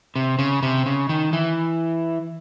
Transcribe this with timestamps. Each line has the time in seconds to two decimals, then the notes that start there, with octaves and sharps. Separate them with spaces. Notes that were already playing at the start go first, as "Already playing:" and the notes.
0.16 C3
0.39 C#3
0.63 C3
0.86 C#3
1.09 D#3
1.33 E3